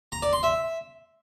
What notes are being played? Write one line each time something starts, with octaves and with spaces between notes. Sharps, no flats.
A#5
D5
C6
E5